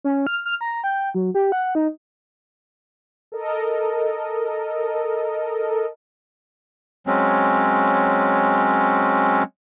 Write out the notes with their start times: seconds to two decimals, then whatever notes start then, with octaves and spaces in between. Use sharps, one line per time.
0.04 C#4
0.27 F6
0.45 F6
0.61 A#5
0.84 G5
1.14 F#3
1.35 G4
1.52 F#5
1.75 D#4
3.32 A4 A#4 D#5
7.07 F#3 G#3 C4 C#4